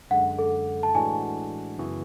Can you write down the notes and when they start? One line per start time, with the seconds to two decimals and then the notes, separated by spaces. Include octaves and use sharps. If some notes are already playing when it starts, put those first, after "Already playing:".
0.10 F#2 D3 G#3 F#5
0.39 A4
0.83 A5
0.94 A2 E3 G#3 D4 F#4 G#5
1.78 F#2 C#3 E3 B3 F#4